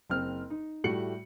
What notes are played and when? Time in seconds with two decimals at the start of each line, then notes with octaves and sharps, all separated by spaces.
0.10 F#1 C4 F6
0.50 D#4
0.84 A2 G3 A3 F#4 C#7 F#7